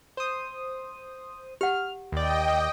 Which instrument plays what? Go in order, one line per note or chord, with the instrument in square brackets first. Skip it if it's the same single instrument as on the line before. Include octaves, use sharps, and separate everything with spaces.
[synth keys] C5 D#6
[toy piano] G4 F#5 [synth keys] F6
[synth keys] D#2 D5 [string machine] D#5 G5